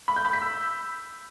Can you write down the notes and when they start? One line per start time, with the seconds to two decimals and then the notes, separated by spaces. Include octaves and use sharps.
0.08 B5
0.16 G6
0.25 B5
0.33 B6
0.42 E6